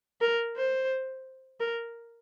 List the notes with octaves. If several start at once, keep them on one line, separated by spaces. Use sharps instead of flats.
A#4
C5
A#4